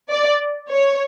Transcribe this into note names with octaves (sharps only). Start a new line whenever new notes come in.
D5
C#5